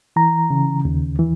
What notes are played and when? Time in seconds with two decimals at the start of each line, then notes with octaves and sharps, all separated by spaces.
0.16 E3 A#5
0.50 C#3
0.85 D#2
1.19 E3